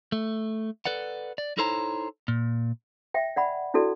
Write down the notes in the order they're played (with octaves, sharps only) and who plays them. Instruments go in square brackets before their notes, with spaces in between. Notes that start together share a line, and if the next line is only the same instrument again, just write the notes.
[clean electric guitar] A3
A4 B4 D5 F#5
D5
D#4 E4 A4 C5 C#5 A#5
A#2
[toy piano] E5 G5
D5 F#5 B5
D4 E4 F#4 A4 D5